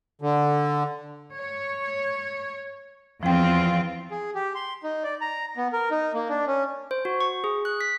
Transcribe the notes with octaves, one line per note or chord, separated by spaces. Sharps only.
D3
C#5
E2 F3 C4 F4 G5
G#4
G4
C6
D#4
D5
A#5
B3
A#4
D#4
A#3
D4
C#4
C5
F#4
C#6
G#4
F#6
B6